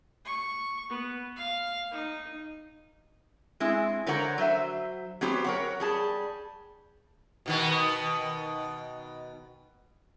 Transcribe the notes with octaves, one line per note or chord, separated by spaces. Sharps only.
C#6
B3
F5
D#4
G#3 C4 E4
D3 A#4 C5 C#5 F#5 A#5
F#3 C5 E5
F#3 B3 C4 G4 C5 C#5
A#4 C#5 F#5
G3 G#4 A5
B2 D#3 B3